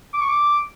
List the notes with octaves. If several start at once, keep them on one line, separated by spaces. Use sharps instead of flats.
D6
C#6
D6